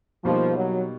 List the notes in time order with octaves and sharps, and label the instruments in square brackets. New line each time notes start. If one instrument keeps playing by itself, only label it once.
[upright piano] B2 G3 A#3 D#4 [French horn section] F3
[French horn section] F#3